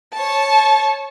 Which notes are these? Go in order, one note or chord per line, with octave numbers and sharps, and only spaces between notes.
C#5 A5